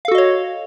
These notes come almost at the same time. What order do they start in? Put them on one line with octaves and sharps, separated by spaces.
F5 A4 F#4 D#5 C#5